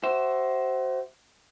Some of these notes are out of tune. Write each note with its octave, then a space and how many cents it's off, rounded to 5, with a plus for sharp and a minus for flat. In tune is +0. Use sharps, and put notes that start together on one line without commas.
F#4 +30 C5 +0 E5 +0